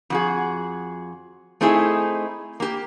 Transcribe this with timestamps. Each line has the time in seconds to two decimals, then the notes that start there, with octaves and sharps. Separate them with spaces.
0.10 F2 F#4 G#4
1.61 A3 C4 D#4 E4 G#4
2.60 A#3 G4